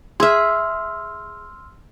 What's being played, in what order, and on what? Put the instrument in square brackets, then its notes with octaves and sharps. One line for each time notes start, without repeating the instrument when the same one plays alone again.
[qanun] G#4 E5 [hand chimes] C6 E6 F6